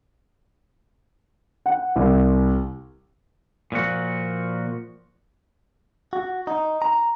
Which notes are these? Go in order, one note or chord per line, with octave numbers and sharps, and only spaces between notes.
F#5
C2
A#2 F3 F#4
F#4
D#4
A#5